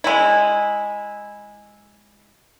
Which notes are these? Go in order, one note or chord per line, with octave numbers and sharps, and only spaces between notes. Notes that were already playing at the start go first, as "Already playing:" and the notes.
G#3 E4